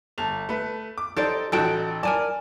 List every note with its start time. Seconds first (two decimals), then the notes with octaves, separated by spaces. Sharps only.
0.18 G1 A5 F7
0.49 A3 B4
0.98 D6
1.17 D#4 G4 A4 C5 D5
1.52 A1 D#4 F#4 A4 G5 A5
2.03 A#4 D5 G#5 A5